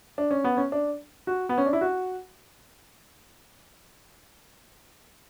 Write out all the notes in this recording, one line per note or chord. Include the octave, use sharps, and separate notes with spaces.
D4
C#4
B3
C#4
D4
F#4
B3
C#4
D4
E4
F#4